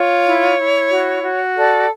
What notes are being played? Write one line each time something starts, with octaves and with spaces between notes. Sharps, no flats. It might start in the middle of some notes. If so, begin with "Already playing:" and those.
Already playing: F4 C#5
E4
E4
F#4
F#4
A4 D5